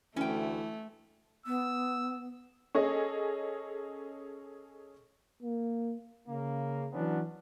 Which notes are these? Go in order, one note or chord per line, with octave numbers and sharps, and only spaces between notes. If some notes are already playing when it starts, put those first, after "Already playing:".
D2 E3 A3 C#4 G5
B3 E6
C#4 G#4 A4 D#5
A#3
C#3 A#3
E3 F#3 B3 C#4 D4